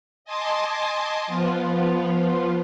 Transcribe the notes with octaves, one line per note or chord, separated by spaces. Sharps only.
D#5 G#5 A5 C6 D6
F3 B3 F4